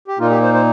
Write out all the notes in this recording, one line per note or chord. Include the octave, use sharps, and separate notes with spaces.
G4
A#2 A#3 D#4 F4
G4
C5
C5